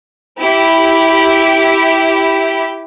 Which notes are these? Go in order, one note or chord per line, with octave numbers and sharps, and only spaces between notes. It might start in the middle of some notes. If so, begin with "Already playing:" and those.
E4 G4